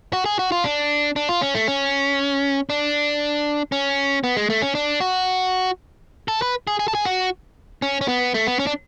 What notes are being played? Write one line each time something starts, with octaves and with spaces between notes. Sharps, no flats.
F#4
G#4
F#4
F4
D4
D4
F4
C#4
A3
C#4
D4
C#4
B3
G#3
A3
C#4
D4
F#4
A4
B4
G#4
G#4
A4
G#4
F#4
C#4
C#4
B3
A3
B3
C#4
D4